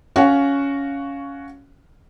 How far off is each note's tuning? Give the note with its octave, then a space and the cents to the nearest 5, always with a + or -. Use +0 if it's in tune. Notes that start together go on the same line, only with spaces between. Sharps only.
C#4 +10 F#4 +0 F5 +0